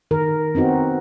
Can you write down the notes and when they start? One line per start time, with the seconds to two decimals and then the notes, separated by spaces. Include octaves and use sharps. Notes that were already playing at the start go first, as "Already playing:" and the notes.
0.11 D#3 A#4
0.55 B3 C4 D#4 F#4